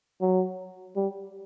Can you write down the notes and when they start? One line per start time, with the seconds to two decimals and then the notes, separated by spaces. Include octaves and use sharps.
0.21 F#3
0.96 G3